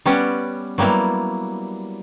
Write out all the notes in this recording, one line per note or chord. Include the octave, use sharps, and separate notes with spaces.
G3 B3 C#4 B4 D5 F#5
F#3 G3 A#3 B3 E4